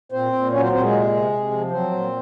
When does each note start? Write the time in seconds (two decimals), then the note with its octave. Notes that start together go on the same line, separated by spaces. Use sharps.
0.12 A#2 C4 C5
0.33 A#2
0.52 F#3 C#4 C#5
0.62 C4 C5
0.72 A#2 C4 C5
0.82 G#3 G#4
0.92 C3
1.12 C3
1.32 C3
1.51 F3
1.71 F#3 C4 C5
1.91 A#2